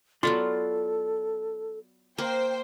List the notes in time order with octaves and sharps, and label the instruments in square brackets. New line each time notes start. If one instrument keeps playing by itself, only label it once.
[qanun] F#3 B3 F4 [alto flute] A4 [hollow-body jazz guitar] D5 C6
[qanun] A#3 [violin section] C5 G5